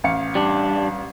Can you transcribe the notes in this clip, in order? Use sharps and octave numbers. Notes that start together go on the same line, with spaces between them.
A1 F5 C#7
G3 D4